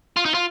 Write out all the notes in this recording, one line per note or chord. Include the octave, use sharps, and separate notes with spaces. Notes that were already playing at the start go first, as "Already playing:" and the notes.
F4
D#4
F4